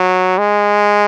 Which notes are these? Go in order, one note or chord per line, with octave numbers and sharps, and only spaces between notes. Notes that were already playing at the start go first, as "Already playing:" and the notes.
Already playing: F#3
G#3